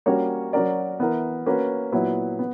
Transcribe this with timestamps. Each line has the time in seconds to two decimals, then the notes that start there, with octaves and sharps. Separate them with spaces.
0.06 G3 A#3 C#4 F#4 C#5
0.53 F#3 C#4 F#4 A#4 D5
0.99 E3 B3 E4 A#4
1.46 A#3 C#4 F#4 B4
1.92 A#2 F#3 B3 E4 B4
2.39 B3